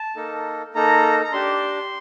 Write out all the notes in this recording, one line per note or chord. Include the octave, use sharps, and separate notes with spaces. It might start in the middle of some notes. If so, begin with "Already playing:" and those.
Already playing: A5
A#3 D#4 A4
A#3 D#4 A4 A#5
A#5
D4 G4 C6